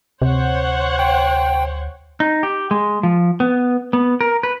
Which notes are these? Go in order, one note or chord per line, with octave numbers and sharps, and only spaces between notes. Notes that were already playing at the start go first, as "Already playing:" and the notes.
D2 C3 C5 C#5 F#5
G5
D#4
G4
G#3
F3
B3
B3
A#4
B4